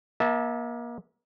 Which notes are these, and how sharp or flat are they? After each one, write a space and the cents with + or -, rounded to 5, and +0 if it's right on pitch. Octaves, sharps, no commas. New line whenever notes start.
A#3 +35 E5 -30 A5 +0